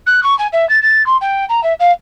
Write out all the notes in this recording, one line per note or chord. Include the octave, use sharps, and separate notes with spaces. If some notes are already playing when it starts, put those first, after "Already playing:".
F#6
C#6
G#5
E5
A6
A6
C6
G5
A#5
E5
F5